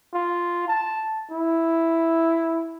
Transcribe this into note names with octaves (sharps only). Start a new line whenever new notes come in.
F4
A5
E4